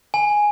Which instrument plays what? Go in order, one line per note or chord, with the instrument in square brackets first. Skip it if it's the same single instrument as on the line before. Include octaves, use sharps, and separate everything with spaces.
[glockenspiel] G#5